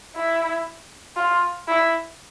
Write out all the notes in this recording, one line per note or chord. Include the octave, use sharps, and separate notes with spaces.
E4
F4
E4